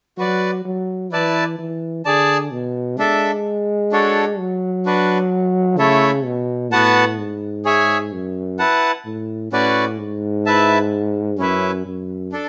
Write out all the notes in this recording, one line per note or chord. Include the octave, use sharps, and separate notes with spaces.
F#3 F#4 B4 D5
F#3
E3 E4 B4 D5 A5
E3
D3 G#4 D5 A5
B2
G#3 D4 A4 E5
D4 F#4 A4 C#5
F#3
D4 F#4 B4
C#3 A3 E4 A4 C#5 E5
B2
A2 B3 F#4 B4 F#5 A5
G#2
G#4 C#5 E5 G#5
F#2
E4 B4 F#5 A5
A2
A2 C#4 F#4 B4 D5
G#2
E4 B4 E5 A5
F#2 C#4 E4 B4 E5
F#2
D4 A4